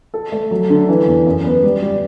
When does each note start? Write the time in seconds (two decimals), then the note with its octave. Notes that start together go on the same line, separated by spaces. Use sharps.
0.14 A4
0.32 A3
0.51 F#3
0.70 D3
0.89 E3
1.07 E2
1.26 F#2
1.45 B3
1.63 G3
1.82 G3